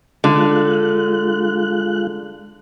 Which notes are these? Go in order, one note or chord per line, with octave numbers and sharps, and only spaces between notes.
D3 G#3 F4 F#6